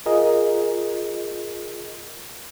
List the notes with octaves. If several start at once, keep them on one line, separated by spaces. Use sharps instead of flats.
F4 G#4 A#4 D#5